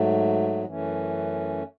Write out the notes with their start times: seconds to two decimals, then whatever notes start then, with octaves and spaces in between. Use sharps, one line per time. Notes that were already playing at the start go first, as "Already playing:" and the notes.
Already playing: G#2 F#3 A3
0.64 F#2 E3 A3 C#4